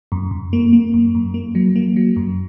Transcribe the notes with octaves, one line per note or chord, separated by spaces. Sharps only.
F#2
F#2
A#3
A#3
F#2
F#2
A#3
F#3
A#3
F#3
F#2